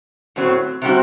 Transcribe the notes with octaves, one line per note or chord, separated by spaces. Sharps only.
A2 F#3 C4
C3 G3 C4 F#4